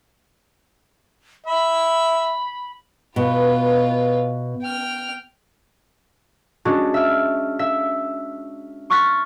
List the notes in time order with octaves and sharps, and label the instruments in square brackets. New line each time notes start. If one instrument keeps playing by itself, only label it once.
[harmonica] E5 [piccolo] B5
[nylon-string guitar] B2 [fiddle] F4 B4
[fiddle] G5 F6
[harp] G#3 C#4 D4 F#4
E5 F6
E5
C6 C#6 F6 F#6 A6 B6